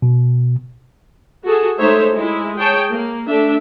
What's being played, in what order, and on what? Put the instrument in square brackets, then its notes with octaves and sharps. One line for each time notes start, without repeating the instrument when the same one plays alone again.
[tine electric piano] B2
[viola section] F#4 G#4 A4
G#3 A3 D#4 C5 C#5 E5
G#3 E4
G#4 C#5 G5 A5
A#3
A3 D4 E5